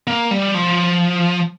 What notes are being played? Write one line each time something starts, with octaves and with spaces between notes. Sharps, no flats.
A#3
G3
F3